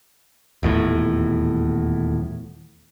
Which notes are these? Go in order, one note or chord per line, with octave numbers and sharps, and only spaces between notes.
D#1 E2 A2